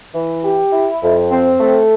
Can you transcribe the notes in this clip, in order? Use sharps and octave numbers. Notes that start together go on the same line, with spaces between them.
E3
G4
E4
F2
C4
A3